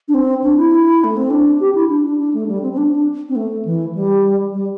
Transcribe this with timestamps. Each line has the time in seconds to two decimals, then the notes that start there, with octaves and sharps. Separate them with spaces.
0.08 D4
0.14 C4
0.43 D4
0.57 E4
1.04 A3
1.17 C4
1.30 D4
1.60 G4
1.75 E4
1.89 D4
2.05 D4
2.19 D4
2.33 A3
2.48 G3
2.63 C4
2.73 C4
2.77 D4
2.92 D4
3.29 C4
3.36 A3
3.65 E3
3.95 G3
4.53 G3